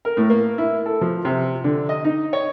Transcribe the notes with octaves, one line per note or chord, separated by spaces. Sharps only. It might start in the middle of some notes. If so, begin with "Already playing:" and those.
A#4
A2
A#3
E4
A4
F3
C3
D3
D#5
D#4
C#5